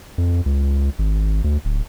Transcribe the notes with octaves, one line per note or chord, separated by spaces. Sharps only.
F2
C#2
G#1
D2
D1